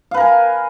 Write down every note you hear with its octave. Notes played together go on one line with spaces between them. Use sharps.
A#4 B4 F5 G#5